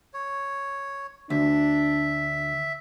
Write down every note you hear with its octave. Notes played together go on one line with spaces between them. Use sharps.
C#5
D2 D4 E5